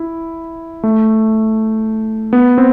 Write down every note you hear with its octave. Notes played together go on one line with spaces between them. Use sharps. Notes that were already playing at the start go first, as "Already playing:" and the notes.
Already playing: E4
A3
B3
C4